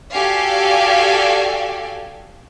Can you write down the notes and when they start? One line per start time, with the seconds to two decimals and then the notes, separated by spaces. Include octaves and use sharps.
0.11 F#4 G4 A4 D5 F5 G#5